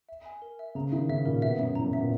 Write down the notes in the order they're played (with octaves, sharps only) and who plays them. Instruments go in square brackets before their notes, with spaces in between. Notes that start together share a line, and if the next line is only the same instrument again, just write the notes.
[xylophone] E5
G#5
A#4
E5
[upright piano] C#3 [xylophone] A#5
[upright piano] D#3 [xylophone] E5
[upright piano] C#3 [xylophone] E5
[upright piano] A#2 [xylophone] A#4
[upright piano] B2 [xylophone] E5
[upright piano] F#2 [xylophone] E5
[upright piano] E2 [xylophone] A#5
[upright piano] F#2
[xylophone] E5
[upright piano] A#2